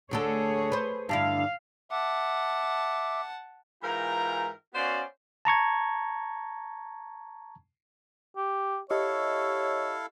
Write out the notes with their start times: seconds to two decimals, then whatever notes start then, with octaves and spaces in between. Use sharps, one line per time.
0.11 D2 D3 G#4 A4 C#5
0.72 B4 C5
1.09 G2 D3 E4 F5
1.91 E5 F#5 A5 D6
3.83 G#2 E3 F4 A#4 G5 A#5
4.74 B3 C#4 F#4 C5 D5 F5
5.45 A5 A#5 C#6 G#6
8.37 G4
8.90 E4 G4 A4 C#5 D#5 F5 C#6